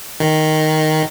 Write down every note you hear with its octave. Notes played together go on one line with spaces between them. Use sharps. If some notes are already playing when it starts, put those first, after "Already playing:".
D#3